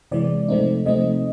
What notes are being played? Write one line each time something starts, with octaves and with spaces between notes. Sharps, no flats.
C3 E3 G#3 D5
C3 F3 A3 C4 D#4
C3 F3 A3 C4 D#4 D#5